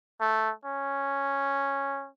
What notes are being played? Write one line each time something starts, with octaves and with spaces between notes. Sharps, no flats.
A3
C#4